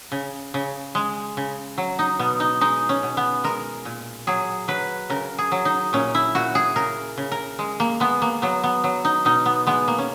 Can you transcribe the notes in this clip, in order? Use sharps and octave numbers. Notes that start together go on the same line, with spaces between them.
C#3
C#3
G#3
C#3
F#3
D#4
B2 B3
D#4
G#3 D#4
C#4
B2
B3
G#3 A#4
A#2
F#3 G#4
F#3 B4
C#3 A#4
G#4
F#3
D#4
A#2 C#4
E4
A#2 F#4
G#4
C#3 A#4
C#3
A#4
G#3
A#3
G#3 B3
A#3
F#3 B3
B3
F#3
D#4
B2 D#4
B3
G#3 B3
A#3
C#4